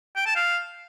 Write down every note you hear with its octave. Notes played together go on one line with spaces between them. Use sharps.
G5
A5
F5